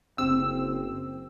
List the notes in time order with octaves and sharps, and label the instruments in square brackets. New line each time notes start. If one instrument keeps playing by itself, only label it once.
[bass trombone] F#1 [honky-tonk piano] C4 [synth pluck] E6